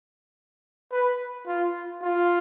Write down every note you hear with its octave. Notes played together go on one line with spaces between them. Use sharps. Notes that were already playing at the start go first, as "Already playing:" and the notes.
B4
F4
F4